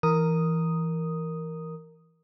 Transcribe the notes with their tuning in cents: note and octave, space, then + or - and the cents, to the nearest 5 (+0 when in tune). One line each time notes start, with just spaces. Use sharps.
E3 +0 A#4 -5 D#6 +0